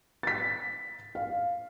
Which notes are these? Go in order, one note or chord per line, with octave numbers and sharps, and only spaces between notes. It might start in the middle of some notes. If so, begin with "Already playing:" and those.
A6 B6
F5